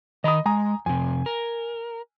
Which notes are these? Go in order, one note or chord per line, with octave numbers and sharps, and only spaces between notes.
D#3 D#5 A#5 B5 D#6
G#3 G#5 A#5 D#6
F2 C3 G#5
A#4